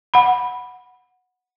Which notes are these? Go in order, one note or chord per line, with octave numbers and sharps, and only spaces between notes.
F#5 B5